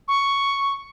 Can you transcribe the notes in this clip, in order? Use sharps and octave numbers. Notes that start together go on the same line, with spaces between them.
C#6